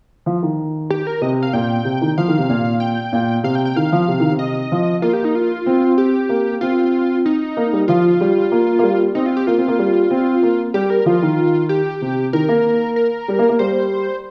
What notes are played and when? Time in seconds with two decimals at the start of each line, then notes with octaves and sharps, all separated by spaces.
0.26 F3
0.43 D#3
0.91 G4
1.07 A#4
1.21 C3 D#5
1.43 F5
1.53 A#2 G5
1.85 C3
2.01 D#3
2.18 F3 F5
2.28 D#3
2.38 C3
2.50 A#2
2.80 G5
3.13 A#2
3.44 C3 F5
3.55 G5
3.65 G5
3.76 D#3 F5
3.92 F3
4.08 C3
4.20 D#3
4.31 C3
4.39 D#5
4.72 F3
5.02 A#3 F4
5.13 G4
5.25 D#4
5.35 F4
5.66 C4
5.98 G4
6.29 A#3
6.61 C4 F4
7.26 D#4
7.57 A#3
7.73 G3
7.88 F3 F4
8.21 G3
8.52 A#3
8.79 A#3
8.83 G3
9.15 C4 D#4
9.26 F4
9.37 G4
9.47 A#3 F4
9.58 C4
9.68 A#3
9.79 G3
10.11 C4
10.43 A#3
10.74 G3 G4
10.90 A#4
11.06 F3 F4
11.22 D#3
11.69 G4
12.01 C3
12.33 D#3 A#4
12.48 A#3
12.96 A#4
13.28 G3
13.39 A#3
13.49 A#3
13.59 G3 C5